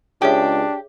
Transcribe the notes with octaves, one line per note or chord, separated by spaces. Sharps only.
C#2 D4 G4 G#4 C#5 E5